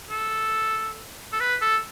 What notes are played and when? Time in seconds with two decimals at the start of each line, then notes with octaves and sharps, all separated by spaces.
0.10 A4
1.33 A4
1.40 B4
1.61 A4